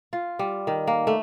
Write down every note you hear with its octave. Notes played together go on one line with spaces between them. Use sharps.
F4
G3
D#3
A#3
A3